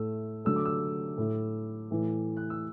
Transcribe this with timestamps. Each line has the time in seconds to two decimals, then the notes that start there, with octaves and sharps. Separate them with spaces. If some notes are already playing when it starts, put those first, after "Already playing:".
Already playing: A2 A3 E6
0.45 D3 F#3 A3 E6
0.56 D6
0.65 E6
1.18 A2 A3
1.91 A2 E3 A3
2.37 F#6
2.50 E6